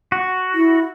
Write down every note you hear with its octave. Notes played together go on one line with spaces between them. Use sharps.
F#4
E4